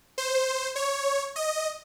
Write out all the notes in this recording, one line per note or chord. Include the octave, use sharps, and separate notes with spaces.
C5
C#5
D#5